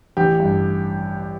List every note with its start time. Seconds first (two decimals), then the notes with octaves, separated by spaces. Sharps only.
0.17 A1 G4
0.40 G2